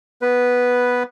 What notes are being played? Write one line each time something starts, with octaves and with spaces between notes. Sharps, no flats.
B3 B4